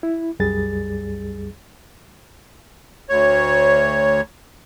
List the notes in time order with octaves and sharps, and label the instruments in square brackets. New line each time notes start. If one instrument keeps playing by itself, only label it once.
[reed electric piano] E4
C2 F#2 G3 G#4 A6
[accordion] D2 C#5